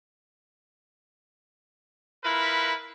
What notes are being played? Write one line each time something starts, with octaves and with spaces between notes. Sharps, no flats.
E4 F4 A#4 B4